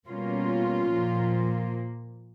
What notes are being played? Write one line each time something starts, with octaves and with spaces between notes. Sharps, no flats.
B2 G3 A#3 C#4 F4
A#2 F3 A#3